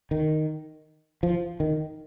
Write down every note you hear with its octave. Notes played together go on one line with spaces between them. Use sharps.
D#3
F3
D#3